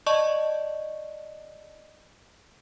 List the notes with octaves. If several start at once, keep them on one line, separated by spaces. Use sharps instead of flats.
D5 D#5 A5 C#6